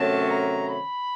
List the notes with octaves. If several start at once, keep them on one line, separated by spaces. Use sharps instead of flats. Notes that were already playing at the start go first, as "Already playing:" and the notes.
Already playing: C3 D#3 F#3 A3 C#4 A5
A#5
B5